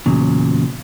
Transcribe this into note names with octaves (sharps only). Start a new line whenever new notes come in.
E2 A#2 C#3 F#3